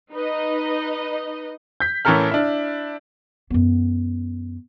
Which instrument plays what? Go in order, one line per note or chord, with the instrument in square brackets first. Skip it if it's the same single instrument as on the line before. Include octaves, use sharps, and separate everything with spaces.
[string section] D#4 B4 D#5
[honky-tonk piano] G6 B6
A2 E3 C#4 A4 A#4 F6
D4 E4
[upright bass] F#2 B3